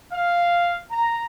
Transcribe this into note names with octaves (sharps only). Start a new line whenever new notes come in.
F5
A#5